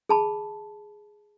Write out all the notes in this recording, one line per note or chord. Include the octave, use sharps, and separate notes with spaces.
G#4 A5 B5